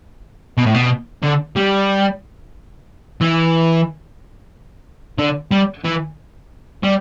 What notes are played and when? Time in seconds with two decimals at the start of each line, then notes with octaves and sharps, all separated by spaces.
0.57 B2
0.66 A2
0.74 B2
1.23 D3
1.56 G3
3.21 E3
5.18 D3
5.51 G3
5.85 E3
6.83 G3